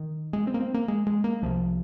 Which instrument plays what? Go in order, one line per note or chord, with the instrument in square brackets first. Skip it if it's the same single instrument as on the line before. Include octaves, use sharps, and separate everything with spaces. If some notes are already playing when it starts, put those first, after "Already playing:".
Already playing: [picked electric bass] D#3
G#3
C4
A#3
C4
A#3
G#3
G#3
A#3
C2 C3 F3